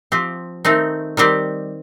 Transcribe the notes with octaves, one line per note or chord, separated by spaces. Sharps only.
F3 C4 G4
D#3 A3 C4 D#4
D#3 G3 C4 G4